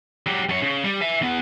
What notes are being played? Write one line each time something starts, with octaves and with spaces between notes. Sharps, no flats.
F#3 G4
F#2 C#5
C#3
G3
E5 G#5
E2 B3